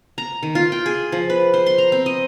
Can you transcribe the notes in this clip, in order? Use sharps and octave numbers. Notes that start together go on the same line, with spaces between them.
A#5
D#3
F4
G5
G#4
F3
B4
C5
C6
A#5
C4
D#5